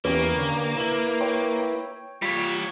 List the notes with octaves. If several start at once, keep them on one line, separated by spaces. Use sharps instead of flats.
E2 A#3 B3 C#4 G4 B4
D3
E4 B4 E7 F#7
C#5 G5
G3 F4 C#5 B6 D7